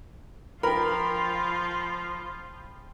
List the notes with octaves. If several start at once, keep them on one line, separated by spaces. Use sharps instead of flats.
F3 F4 A#4 G5 B5